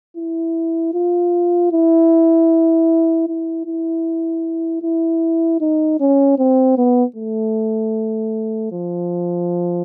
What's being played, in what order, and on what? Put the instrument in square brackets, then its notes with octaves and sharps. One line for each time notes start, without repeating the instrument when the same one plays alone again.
[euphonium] E4
F4
E4
E4
E4
E4
D#4
C#4
C4
B3
A3
F3